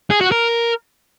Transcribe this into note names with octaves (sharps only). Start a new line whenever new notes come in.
G#4
F#4
A#4